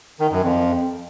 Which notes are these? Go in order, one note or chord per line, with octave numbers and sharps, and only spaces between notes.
D#3
F#2
F2